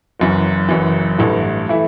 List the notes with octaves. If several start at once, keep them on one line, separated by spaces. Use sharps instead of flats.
F#1 F#2 E3
F#1 F#2 E3
A1 G2 E3 A3 E4
E3 A3 E4